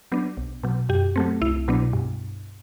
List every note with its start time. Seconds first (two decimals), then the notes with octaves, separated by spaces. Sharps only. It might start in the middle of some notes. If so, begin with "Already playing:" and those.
0.12 F#3 B3 D4
0.37 B1
0.63 B2 F#3
0.89 F#2 G4
1.16 F#3 A3 C4
1.41 C2 E4
1.68 B2 F#3 B3 D4
1.93 G2